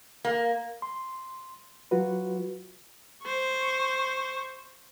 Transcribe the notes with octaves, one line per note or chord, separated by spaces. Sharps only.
A#3
C6
F#3 F4 F#4 B4
C5 C#6